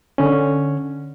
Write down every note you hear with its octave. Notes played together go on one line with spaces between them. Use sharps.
D3 C#4